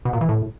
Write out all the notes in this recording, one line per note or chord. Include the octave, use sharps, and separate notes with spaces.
B2
A#2
E3
A2